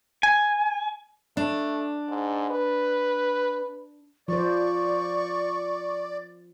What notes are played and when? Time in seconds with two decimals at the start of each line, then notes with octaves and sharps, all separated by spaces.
0.23 G#5
1.37 A3 D4
2.09 G#2
2.50 B4
4.28 F3 C5 D5 C#6